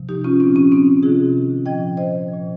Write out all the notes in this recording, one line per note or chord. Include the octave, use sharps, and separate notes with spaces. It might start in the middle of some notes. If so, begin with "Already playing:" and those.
Already playing: C3 F3
D#4 G4
C#4 F4
A#2 F3 C4 D#4
C#4
C4 D#4
C3 D#3 F4 G#4
A#2 F3 D#5 G5
C5 D#5
A#2 F3